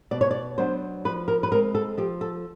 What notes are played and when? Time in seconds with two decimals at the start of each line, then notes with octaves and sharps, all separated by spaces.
0.11 B2 D5
0.21 C#5
0.31 D5
0.58 F#3 B3 D4 C5
1.05 F3 B4
1.28 A#4
1.43 B4
1.51 G#3 C4 A#4
1.75 A4
1.97 F3 G4
2.21 A4